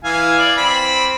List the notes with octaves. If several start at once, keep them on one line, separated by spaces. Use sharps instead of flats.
E3 F5 G#5
D5
C4 B5